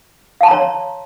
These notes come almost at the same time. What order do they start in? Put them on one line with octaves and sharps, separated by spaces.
F5 A5 C6 A#5 C#5